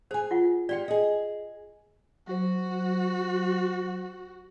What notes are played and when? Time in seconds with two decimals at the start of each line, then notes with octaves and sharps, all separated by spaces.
0.11 G#4 C5 G#5
0.31 F4 F#5
0.69 F4 G4 D5 G5
0.88 G#4 D#5
2.27 F#3 F#4 C5